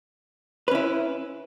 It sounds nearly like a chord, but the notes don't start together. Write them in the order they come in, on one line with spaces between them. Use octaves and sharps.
B4 C#4 E4